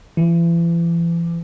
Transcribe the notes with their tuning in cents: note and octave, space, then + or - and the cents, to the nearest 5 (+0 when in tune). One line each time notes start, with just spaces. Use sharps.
E3 +40